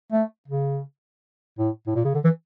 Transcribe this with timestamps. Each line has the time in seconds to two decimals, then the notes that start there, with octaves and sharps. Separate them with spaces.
0.12 A3
0.48 C#3
1.59 A2
1.87 A2
1.95 A#2
2.05 C#3
2.15 D3
2.24 E3